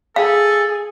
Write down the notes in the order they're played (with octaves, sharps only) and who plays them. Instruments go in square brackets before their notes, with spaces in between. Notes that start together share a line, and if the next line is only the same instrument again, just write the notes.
[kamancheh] G#4 [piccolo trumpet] A4 [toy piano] F5